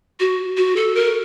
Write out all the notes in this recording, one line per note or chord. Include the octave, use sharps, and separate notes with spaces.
F#4
F#4
A4
A#4